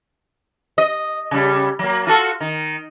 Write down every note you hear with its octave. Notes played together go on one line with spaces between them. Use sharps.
D#5
C#3 G3
F#3 A#3
F4 F#4 A4
D#3